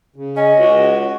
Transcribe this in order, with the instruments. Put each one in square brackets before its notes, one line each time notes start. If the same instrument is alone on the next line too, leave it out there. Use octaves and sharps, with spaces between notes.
[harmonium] C#3
[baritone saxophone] C#4 [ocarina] D#5
[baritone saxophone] C#2 [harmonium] F#4